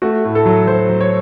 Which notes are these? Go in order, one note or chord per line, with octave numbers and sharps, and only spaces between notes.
A3 F#4
A2
A4
F#3
F#3 C5
F#3
C#5